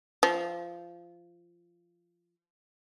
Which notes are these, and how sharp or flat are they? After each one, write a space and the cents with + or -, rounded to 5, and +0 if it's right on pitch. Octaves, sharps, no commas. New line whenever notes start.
F3 -15